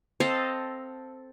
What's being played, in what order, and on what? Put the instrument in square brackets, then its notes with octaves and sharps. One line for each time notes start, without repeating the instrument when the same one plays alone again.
[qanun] C4 A4 D#5 F5